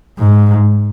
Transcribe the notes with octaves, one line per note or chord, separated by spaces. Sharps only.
G#2